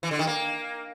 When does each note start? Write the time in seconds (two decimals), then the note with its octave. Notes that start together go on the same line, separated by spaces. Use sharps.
0.03 E3
0.11 D3
0.19 D#3
0.27 A#3